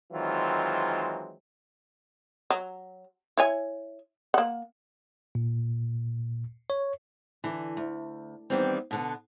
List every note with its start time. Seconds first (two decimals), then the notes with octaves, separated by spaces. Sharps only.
0.12 D#3 E3 F#3 G#3 C4 F4
2.50 F#3
3.37 E4 C#5 G#5
4.34 A#3 F#5
5.35 A#2
6.70 C#5
7.44 D3 E3
7.77 D2
8.50 D#3 E3 G3 B3 C4
8.91 B2 D3 B3